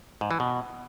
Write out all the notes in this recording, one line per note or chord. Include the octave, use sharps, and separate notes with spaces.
G#2
E3
B2